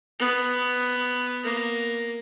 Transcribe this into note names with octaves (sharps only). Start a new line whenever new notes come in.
B3
A#3